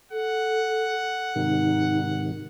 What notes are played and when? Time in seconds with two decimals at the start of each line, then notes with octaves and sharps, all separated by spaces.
0.12 A4 F#5
1.36 G#2 C3 D#3 D#4